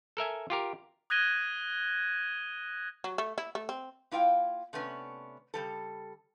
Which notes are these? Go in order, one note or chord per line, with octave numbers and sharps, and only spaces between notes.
A4 A#4 E5 G#5
F4 G4 A#4
D#6 F#6 G#6 A#6 D#7 G7
F#3
A3
E4
A3
C4
A#3 E4 F4 F5 G5
C3 A3 B3 C#4 D4
C#3 G3 A4